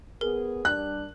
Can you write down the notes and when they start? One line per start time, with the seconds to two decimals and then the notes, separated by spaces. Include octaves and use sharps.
0.21 B3 G#4 A#4
0.65 G3 D4 F#6